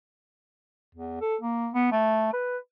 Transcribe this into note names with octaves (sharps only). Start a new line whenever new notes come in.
E2
A4
A#3
B3
A3
B4